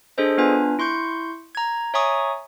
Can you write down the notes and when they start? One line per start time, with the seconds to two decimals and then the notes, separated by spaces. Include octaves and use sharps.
0.18 D4 G#4 A4 C5 D#5
0.38 B3 D4 F4 B4 G#5
0.79 E4 C6 C#6 G6 C#7
1.55 A#5 G#6
1.94 C#5 E5 G#5 A#5 C#6 D#6